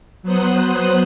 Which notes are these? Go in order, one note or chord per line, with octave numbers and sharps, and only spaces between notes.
F#3 B3 C5 D#6 F#6